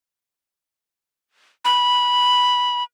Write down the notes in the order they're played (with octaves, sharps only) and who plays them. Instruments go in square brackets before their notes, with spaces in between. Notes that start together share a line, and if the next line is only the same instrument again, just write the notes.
[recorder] B5